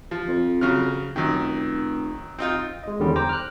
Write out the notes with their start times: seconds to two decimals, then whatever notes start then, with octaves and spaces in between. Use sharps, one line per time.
0.11 F3
0.28 F2
0.61 C#3 F#3 F6
1.16 F1 F#2 D#3
2.38 C4 D#4 F4
2.83 G#3 D#5
2.99 E2 D3 D#3 G3 C#4
3.16 C5 G5 A#5 D6
3.29 F6 F#6